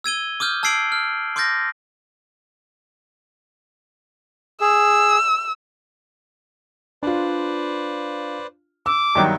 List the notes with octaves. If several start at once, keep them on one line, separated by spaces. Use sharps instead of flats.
E6 G#6 D#7 G7
D6 D#6 F6 G6
A5 E6 G#6 C7 D7 F#7
F6
C6 D6 F6 G6 A6 A#6
G#4 E6
D4 F4 B4 C5 D5
D6 E6
G2 D#3 F#3 E5 G5